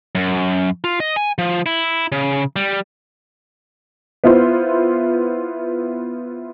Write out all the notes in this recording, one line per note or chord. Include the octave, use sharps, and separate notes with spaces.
F#2
F4
D#5
G#5
F3
E4
C#3
G3
B3 E4 F4 C5